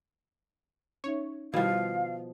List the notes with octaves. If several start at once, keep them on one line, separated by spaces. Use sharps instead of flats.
C#4 D#4 C#5 E5
B2 D#3 F3 G3 E4 F5 B5 G#6